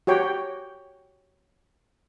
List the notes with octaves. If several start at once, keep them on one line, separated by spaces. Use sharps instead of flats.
F#4 G4 C#5 G5